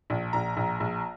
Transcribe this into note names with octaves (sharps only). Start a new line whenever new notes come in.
A#1
A#1 A#5
A#1
A#1